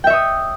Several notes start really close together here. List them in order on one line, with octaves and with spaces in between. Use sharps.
G5 E5 C#5 D#6